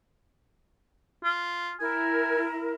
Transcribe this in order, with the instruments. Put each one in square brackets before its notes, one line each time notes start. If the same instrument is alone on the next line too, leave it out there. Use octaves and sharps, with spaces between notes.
[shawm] F4
[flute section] E4 A#4 [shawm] G#5